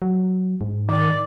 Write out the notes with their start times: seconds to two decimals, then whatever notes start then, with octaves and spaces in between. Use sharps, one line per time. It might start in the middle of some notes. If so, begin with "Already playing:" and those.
0.02 F#3
0.61 G#2
0.89 D#3 D5 D6